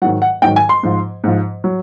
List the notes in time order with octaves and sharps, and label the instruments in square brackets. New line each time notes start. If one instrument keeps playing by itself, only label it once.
[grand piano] G#2 D#3 F#3 F#5
F#5
G#2 D#3 F#3 G5
G#5
C6
G#2 F3
G#2 F3
F#3